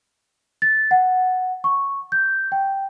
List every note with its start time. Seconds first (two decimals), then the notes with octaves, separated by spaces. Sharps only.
0.62 A6
0.91 F#5
1.64 C#6
2.12 G6
2.52 G5